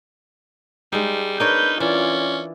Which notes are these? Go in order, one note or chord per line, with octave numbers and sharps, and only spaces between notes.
G3 G#3 D#4
D4 D#4 A#4 B4 C#5 G6
E3 C#4 F4 D5